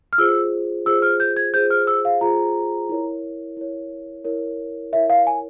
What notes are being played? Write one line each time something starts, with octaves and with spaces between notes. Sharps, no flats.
F6
F4 G#4 C5 E6
F4 G#4 C5 E6
F6
G6
G#6
F4 G#4 C5 G6
F6
E6
F5
F4 G#4 C5 A#5
E4 A#4 C#5
E4 A#4 C#5
E4 A#4 C#5
E4 A#4 C#5 E5
F5
G#5